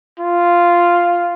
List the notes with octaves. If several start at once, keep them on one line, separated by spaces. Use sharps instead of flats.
F4